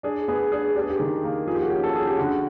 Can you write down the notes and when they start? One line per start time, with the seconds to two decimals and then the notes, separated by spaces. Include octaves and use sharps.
0.03 D4 G#4
0.28 B3 G#4
0.52 D4 G#4
0.75 D4 G4
0.83 G#4
0.90 G4
1.00 D#3
1.24 A#3
1.46 F3 G#4
1.54 G4
1.62 F#4
1.70 C#4 G4
1.83 A4
1.94 C#4 G#4
2.07 G4
2.18 D3 F#4